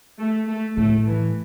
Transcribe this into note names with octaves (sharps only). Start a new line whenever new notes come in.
A3
A3
A2 A3
E3